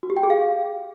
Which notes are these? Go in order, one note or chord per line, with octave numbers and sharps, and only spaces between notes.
F#4
G4
G5
G#4
F5